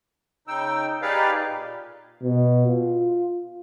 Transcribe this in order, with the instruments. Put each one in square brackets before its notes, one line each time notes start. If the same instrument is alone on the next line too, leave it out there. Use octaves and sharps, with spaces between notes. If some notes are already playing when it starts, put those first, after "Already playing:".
[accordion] C#3 D#4 G5 E6
D#4 G4 G#4 B4 D5 F5
A#2
[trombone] B2
F4